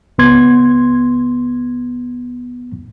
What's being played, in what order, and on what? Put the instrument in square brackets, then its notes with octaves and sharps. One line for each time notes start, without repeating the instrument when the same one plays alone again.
[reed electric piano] C#2 B3 C6 G#6